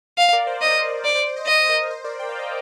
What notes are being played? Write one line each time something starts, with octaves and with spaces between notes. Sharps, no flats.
F5
A#4 D5
C5
D#5
A#4
C5 D5
C5
C5
C5 D#5
C5 D#5
A#4
C5
A#4 D5
G5
F5
D#5